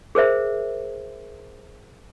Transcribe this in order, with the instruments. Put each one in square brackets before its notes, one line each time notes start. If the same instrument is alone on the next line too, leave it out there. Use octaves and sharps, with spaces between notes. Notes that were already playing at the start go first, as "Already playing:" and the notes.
[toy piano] G#4 A#4 C5 E5